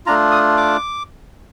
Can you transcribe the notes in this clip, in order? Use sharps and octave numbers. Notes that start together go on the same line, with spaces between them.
A3 D4 F4 A#5
D#6
D6